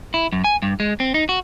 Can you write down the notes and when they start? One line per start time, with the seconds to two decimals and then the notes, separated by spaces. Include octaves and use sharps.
0.14 E4
0.32 F#2
0.44 G#5
0.62 G2
0.80 G#3
1.00 C4
1.14 D#4
1.29 F#4